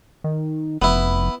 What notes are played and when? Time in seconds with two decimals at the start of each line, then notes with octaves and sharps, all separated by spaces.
0.24 D#3
0.82 F1 B3 E4